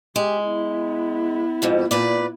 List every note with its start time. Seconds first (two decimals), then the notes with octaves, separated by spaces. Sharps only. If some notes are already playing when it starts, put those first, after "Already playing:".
0.16 G#3 G4
0.44 B3 E4
1.62 F2 G#2 B2
1.91 A#2 B4 D5